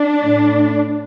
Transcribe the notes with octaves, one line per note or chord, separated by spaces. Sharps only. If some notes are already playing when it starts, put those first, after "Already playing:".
Already playing: D4
A2